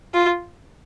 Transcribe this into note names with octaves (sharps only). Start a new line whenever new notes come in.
F4